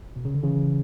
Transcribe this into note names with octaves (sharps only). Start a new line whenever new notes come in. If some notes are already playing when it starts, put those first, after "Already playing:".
B2
C#3
D3
C#3 E3